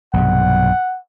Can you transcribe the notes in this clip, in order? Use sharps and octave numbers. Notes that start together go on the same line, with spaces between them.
B1 G2 C3 F#5